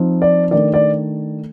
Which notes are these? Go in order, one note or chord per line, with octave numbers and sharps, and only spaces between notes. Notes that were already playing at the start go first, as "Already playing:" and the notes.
Already playing: F3 C4 D#4
D5
D#3 A3 D4 D5
D5